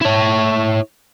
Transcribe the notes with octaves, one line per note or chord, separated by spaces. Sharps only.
E4 C#5